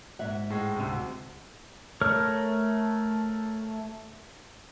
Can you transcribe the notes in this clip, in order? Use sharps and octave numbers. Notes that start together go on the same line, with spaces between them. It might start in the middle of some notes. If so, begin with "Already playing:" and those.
G#2 E5 F#5
A2 G#3
D2 C3
A3 A#4 C#5 F6